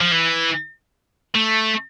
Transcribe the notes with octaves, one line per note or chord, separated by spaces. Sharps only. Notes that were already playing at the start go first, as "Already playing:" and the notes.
F3
E3
A3